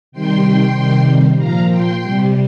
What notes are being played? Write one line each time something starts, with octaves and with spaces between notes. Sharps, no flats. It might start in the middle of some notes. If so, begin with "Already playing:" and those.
C3 D#3 G3 G5 C6
C3 D#3 G3
A#2 F3 F5 A#5
G5 C6
C3 G3